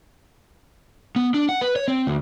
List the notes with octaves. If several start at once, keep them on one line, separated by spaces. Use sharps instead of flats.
B3
D4
F#5
B4
C#5
C4
D2